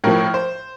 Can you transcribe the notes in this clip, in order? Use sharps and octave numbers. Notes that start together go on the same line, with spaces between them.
A2 F3 A#4
C5